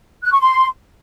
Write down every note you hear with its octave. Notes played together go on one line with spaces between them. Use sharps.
F#6
C#6
C6